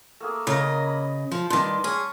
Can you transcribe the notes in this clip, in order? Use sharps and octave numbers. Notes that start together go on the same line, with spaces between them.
A3 A#3 G#4
C#3 A#4 D#5 G#5
B5
F3
G2 D#3 D5 A5 C6
C#4 G#4